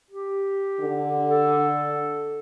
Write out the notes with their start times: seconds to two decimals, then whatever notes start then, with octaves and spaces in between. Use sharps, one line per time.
0.11 G4
0.80 D3
1.29 A4